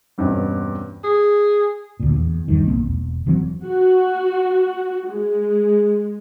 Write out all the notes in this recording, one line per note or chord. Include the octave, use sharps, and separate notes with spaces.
E2 G2 B2 C4 C#4
G#4
D2 A#2
E2
G1 E2 G2 D#3
B1 G#2 A#3 C4
E1
E1 E3 F#3 C4
F#4
G#3